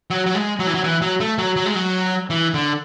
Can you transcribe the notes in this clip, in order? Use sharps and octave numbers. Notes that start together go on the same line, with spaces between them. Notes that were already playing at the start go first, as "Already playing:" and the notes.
F#3
F#3
G#3
F#3
E3
F#3
E3
F#3
A3
F#3
F#3
G#3
F#3
E3
D3